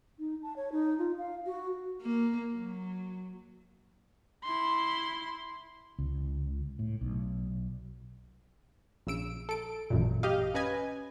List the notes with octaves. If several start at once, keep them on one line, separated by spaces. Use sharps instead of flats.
D#4
A5
C#5
D#4
F4
F5
F#4
A#3
F#3
E4 C6
C#2
A2
B1
A#1 C#3 E6 D7
A4 D7
A1 F#2 A#2
G4 D#5 F5
C#4 B4 D#5 G#5